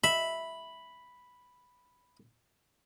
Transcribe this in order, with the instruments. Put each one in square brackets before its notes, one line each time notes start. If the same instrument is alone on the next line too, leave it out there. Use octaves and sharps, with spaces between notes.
[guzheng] E5 [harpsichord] B5